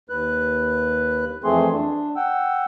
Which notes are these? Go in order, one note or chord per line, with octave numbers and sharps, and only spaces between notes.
D#2 B4 F#6
F2 E3 A3 C4 G#4 C6
D4
F#5 G5 E6